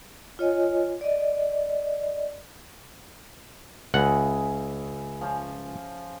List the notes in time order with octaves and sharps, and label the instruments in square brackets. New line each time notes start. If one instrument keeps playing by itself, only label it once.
[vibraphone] F4 C#5 D#5 G#5
D5 D#5
[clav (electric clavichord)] C#2 F#5 [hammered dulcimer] C#4 E4 G#4
[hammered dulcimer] F3 C#4 C5